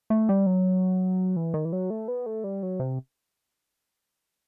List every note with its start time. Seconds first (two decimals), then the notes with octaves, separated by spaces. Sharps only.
0.10 A3
0.29 G3
0.46 F#3
1.36 E3
1.54 D#3
1.65 E3
1.73 F#3
1.90 A3
2.08 B3
2.26 A3
2.44 G3
2.63 F#3
2.80 C3